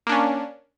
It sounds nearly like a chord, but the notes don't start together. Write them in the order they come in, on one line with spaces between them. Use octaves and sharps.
A#3 D4 C#4